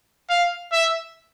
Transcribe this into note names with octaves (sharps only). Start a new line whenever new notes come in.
F5
E5